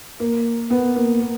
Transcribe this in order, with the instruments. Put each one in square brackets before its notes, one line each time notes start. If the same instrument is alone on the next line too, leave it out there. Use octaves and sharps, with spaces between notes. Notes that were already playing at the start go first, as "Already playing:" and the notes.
[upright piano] A#3
B3
A#3
A#3